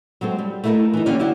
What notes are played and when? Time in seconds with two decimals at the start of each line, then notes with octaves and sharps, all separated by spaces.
0.21 F#3 G#3 C4 A4
0.38 G3
0.64 A3 D#4 E4 F#4 A4 A#4
0.94 E3 D#4
1.06 D3 A#3 C#4 G4
1.20 E4 F#4 G4 D5 F#5